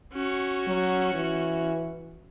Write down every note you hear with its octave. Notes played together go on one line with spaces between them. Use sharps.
C#4 F#4
F#3
E3